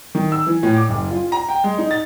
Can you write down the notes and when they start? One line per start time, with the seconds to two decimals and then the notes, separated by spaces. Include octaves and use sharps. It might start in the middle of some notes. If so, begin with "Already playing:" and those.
0.15 D#3
0.32 E6
0.47 E3
0.63 A2
0.77 D6
0.89 F#1
1.11 F4
1.32 A#5
1.49 G5
1.64 G#3
1.78 D#4
1.91 A6